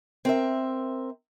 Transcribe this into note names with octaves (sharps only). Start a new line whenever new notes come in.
C4 A#4 E5